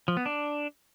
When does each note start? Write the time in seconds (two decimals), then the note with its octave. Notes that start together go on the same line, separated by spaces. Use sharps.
0.08 F3
0.17 B3
0.26 D4